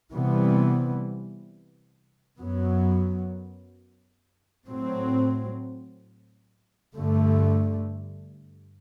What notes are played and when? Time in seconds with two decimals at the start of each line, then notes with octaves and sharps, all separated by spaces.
0.12 C3 E3 G3 B3
2.40 F#2 F#3 B3
4.68 A2 F#3 C4
6.96 G2 D3 A3